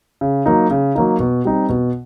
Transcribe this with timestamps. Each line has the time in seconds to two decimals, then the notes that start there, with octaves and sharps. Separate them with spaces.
0.21 C#3
0.46 F#3 A#3 D#4
0.70 C#3
0.95 F#3 A#3 D#4
1.20 B2
1.45 G3 C4 D#4
1.69 B2